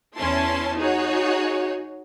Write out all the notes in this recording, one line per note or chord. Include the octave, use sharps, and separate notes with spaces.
E2 C#4 E4 A5 C6
D#4 F#4 G#4 C#5